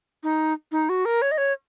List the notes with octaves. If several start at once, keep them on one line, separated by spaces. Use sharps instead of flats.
D#4
D#4
F#4
A#4
C#5
D#5
C#5